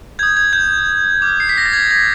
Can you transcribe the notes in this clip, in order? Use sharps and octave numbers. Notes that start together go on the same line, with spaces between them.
D#6 G6 G#6
G#6
G6
D6 F6
C7
B6
A#6
A6
G#6
G#6